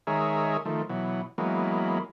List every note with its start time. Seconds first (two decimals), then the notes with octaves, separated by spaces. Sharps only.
0.07 D#3 G#3 G#4 A#4 C#5 E5
0.65 D#3 F3 A3
0.89 B2 E3 F#3
1.38 E3 F#3 G#3 A#3 B3